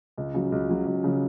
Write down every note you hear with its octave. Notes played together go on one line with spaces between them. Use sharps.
C#2
C#3 F#3
C#2
C#3 F#3
C#2
C#3 F#3